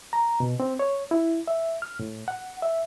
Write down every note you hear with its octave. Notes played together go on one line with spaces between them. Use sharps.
A#5
B2
C4
C#5
E4
E5
F6
A2
F#5
E5